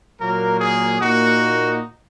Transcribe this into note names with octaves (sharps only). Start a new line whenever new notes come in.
A#2 F#3 A#3 A#4
G#4
A#2 A#3 D#4 F#4